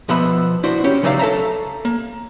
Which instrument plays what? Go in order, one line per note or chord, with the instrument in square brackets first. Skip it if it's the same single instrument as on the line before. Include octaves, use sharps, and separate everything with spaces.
[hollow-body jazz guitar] B2 F3 B3 B4 E5 B5
D4 E4 F#4 C5
C#4 G4
C#3 F#3 D#4 D5 E5 F5
A4 C5 E5 A5 A#5
A#3